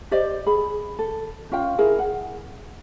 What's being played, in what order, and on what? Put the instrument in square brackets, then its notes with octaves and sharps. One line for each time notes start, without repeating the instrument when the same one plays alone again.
[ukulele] G4 C5 D5 D#5
G#4 B5
A4
C#4 F4 F5 G5
E4 G#4 A#4 G#5
F#5